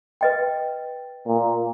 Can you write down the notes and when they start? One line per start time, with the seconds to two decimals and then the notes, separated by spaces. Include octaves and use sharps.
0.21 B4 D#5 G5
1.27 A#2